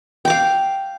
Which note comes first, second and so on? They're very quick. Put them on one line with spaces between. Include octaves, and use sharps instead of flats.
G5 D6 F5